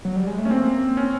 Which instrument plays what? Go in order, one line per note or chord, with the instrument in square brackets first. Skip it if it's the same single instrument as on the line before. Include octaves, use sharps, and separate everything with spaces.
[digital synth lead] F#3
G3
G#3
A3
[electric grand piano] C#4
[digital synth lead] A#3 [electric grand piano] C4
[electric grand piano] C#4